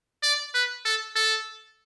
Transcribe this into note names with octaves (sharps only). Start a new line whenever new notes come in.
D5
B4
A4
A4